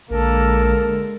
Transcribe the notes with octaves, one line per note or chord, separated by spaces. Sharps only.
A#1 D3 G#3 A#3 A4 A#4